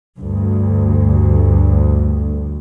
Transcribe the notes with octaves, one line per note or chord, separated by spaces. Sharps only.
D2 G2